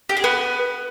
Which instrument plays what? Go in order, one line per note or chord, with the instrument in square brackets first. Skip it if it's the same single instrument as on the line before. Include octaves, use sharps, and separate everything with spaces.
[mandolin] G4
G#4
B3